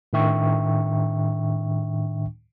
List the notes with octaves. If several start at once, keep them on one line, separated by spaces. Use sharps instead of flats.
A2 D#3 D4 E5 G5 C#6